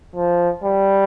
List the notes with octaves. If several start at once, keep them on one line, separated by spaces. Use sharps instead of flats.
F3
G3